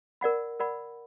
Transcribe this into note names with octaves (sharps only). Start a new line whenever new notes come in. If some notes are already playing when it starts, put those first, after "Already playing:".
A#4 D5 F#5 B5
A#4 D5 F#5 B5